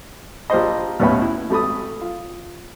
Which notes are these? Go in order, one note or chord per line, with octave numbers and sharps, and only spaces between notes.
A#1 G4 C5 D#5
D#2 A2 B3 C#4 E5 B5
E4
G#1 A3 B5 D#6
F4